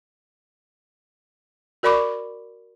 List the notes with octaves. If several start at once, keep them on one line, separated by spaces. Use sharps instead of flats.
F#4 A#4 D5 B5 C#6 D6